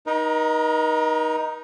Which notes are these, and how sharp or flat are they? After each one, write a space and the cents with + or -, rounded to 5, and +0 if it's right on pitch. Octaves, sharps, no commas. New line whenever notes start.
D#4 +5 A#4 +45